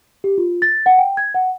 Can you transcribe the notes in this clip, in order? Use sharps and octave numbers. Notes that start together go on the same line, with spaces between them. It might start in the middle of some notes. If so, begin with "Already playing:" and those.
G4
F4
A6
F#5
G5
G#6
F#5